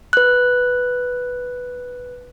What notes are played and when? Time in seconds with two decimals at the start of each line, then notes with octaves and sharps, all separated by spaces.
0.13 B4 F#6